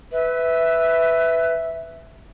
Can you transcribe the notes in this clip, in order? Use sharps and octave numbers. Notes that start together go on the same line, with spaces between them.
B4 E5